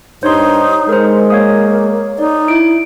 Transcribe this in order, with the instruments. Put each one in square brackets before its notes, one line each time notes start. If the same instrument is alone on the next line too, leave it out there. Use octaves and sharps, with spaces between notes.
[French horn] G2 [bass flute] D#4 [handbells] C5 C#5 C6
[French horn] G#3 [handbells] A#4 C5
[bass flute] A#3 [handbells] C#5 F5 D#6
[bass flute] D#4 [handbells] D5
[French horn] E4 [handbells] D7